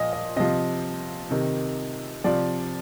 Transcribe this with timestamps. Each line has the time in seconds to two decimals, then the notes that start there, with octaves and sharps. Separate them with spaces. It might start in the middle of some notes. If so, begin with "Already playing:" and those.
Already playing: A#2 F3 D#5
0.13 D#5
0.37 C3 F3 D#5
1.31 C3 D#3
2.24 C3 F3 D5